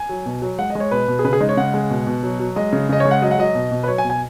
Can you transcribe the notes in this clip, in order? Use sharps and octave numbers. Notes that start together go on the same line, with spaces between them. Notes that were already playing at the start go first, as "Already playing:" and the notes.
Already playing: G#5
F#3
B2
F#3
G#3 F#5
D#5
G#3
C#5
B2 B4
B2
G#4
C#3 B4
G#4
G#3 D#4
C#5
C#3 F#5
G#3
B2
B2
F#3
F#3
G#3 D#5
C#3
C#3 D#5
C#5
G#3
F#5
F#3 D#5
F#5
F#3 D#5
B2
B2
B4
F#3 C#5
G#5
B2
G#5